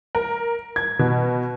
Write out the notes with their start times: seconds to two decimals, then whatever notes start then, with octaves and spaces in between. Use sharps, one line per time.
0.15 A#4
0.76 G#6
0.99 B2